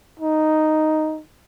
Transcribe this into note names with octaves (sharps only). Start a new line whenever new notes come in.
D#4